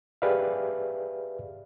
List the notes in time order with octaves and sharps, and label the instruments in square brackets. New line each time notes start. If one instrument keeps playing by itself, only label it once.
[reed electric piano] G4 G#4 B4 D5 E5 F5